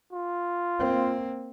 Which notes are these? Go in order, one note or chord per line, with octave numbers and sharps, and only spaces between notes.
F4
A#3 C4